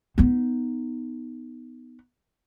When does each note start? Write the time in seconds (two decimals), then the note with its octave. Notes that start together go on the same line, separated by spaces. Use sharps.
0.18 B3 D#4